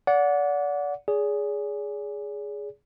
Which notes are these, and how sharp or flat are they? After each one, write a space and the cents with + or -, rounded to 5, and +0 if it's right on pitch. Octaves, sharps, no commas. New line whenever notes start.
D5 -30 F#5 -20
G#4 +0 D5 -40